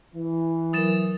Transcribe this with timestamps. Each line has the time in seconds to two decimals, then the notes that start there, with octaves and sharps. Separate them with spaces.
0.14 E3
0.73 F#3 A#4 D#6 A6 E7